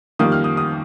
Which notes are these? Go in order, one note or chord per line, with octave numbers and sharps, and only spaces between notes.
F2 D#3 G3 A#3 D#6
F6
D#6
D#6